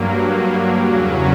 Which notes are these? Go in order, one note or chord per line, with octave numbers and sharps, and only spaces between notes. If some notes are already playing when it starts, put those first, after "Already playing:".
Already playing: G2 F#3 A#3
E2 C#3 F#3 C#4